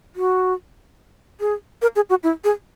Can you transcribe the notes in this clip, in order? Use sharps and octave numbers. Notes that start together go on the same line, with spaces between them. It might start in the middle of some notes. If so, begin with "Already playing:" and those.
F#4
G#4
A#4
G#4
F#4
E4
G#4